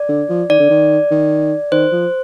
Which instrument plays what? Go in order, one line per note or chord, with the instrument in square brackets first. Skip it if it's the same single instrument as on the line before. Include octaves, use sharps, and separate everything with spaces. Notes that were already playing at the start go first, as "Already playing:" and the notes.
Already playing: [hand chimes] D5
[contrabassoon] D3
F3
[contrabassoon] D#3 [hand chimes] D5
[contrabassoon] D3
D#3
D#3
[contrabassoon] D#3 [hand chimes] C5
[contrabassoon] F3